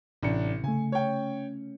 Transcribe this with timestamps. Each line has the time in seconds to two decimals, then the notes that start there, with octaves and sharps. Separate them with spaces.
0.22 A1 C3 D4 C#7
0.64 C#3 A3 G#5
0.92 C#4 C#5 G5